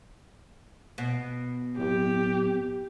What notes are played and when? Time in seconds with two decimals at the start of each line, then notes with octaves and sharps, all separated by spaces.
0.98 B2
1.77 D1 G4